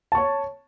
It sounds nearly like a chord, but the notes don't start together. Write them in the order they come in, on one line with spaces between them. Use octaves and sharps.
A5 C#6 C#5